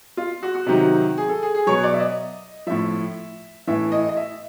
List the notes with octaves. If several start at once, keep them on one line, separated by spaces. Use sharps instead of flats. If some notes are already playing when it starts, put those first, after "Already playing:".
F4
F#4
F#4
C3 D#3 F#3
G#4
A4
G#4
G#4
B2 F#3 C#5
D5
E5
D#5
A2 F3 E5
A2 E3 E5
D#5
D#5
E5